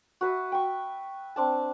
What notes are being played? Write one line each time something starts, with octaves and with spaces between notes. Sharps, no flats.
F#4 B4 E5
G5 C#6
C4 D4 A5